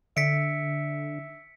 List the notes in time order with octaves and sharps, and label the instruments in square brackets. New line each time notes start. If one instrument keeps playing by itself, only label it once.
[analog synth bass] D3 [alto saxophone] E5 [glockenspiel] B6 C#7 D7